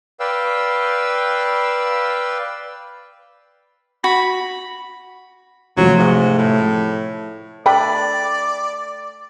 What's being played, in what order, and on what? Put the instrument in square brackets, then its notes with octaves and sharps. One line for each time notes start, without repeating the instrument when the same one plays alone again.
[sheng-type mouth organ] B4 D5 F5 G5 E6
[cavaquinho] F#4 [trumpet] B5
[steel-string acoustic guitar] C3 F3 A3 [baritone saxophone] F#3
[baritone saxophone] G#2
A2
[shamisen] A3 D4 G5 [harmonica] D5 [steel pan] B5